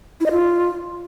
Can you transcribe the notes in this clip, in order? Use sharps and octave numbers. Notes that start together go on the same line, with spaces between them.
E4
D#5
F4